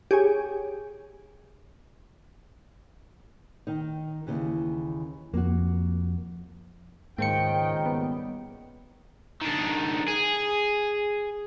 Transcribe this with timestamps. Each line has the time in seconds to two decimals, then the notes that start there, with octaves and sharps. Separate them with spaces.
0.11 G4 G#4 C#5 G#5
3.67 D#3 D#4
4.27 D#2 C#3 E3
5.34 F2 A#3 F#4
7.18 C#2 G#2 D#3 A#3 C5 G5 C#7
7.86 G3 B3
9.41 D#3 D4
10.08 G#4